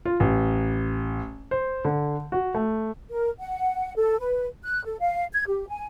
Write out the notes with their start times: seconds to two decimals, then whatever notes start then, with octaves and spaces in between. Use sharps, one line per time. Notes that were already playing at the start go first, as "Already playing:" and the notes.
0.05 F4
0.20 A1
1.51 C5
1.85 D3
2.32 F#4
2.54 A3
3.09 A#4
3.39 F#5
3.97 A4
4.19 B4
4.63 F#6
4.84 A4
5.00 F5
5.33 G#6
5.47 G4
5.68 G#5